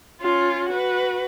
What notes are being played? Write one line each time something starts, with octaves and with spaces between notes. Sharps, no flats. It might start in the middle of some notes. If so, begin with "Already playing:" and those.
C#4 F4
F#4 B4